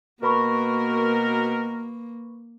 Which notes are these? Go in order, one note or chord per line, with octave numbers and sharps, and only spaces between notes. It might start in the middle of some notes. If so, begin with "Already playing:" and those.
B2 A#3 F#4 A#4 B4 B5 C#6